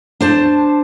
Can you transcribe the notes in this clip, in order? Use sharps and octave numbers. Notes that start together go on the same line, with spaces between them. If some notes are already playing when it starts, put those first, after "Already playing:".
D4 C5 A5